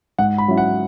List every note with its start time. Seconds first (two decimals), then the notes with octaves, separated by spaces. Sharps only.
0.19 G#2 F#5
0.38 B5
0.48 F#3 C#4 E4
0.58 F#5